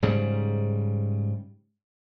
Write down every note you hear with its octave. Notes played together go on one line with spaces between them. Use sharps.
G#2 C#3 G3